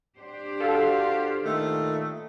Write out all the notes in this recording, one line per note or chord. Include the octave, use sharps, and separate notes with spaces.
D4 G4 C5
F4 F#4 A4 F5
A#2 D#3 A3